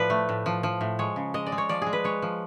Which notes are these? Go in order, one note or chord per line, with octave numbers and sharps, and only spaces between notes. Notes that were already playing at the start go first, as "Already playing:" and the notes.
Already playing: A2 F3 B4 D5
A3
A2
F3
F3
A2
G#3 C#5
C#3
G#3 D#5
D5
G#3
C#5
F3 D5
G#3 G#4
B4
G#3 C#5
F3